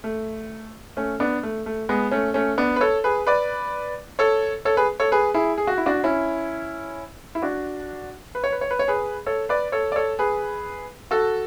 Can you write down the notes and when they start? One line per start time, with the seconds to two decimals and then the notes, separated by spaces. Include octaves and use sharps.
0.04 A3
0.97 A3 C#4
1.20 B3 D4
1.43 A3
1.66 A3
1.89 G#3 B3
2.11 A3 C#4
2.34 A3 C#4
2.58 B3 D4
2.76 B4
2.81 A4 C#5
3.04 G#4 B4
3.27 B4 D5
4.19 A4 C#5
4.65 A4 C#5
4.77 G#4 B4
5.00 A4 C#5
5.12 G#4 B4
5.34 E4 G#4
5.58 G#4
5.67 F#4
5.78 E4
5.86 D4 F#4
6.04 C#4 E4
7.35 E4
7.42 D4 F#4
8.35 B4
8.44 C#5
8.52 B4
8.61 C#5
8.71 B4
8.79 C#5
8.88 G#4 B4
9.26 A4 C#5
9.49 B4 D5
9.72 A4 C#5
9.92 D5
9.96 A4 C#5
10.19 G#4 B4
11.11 F#4 A4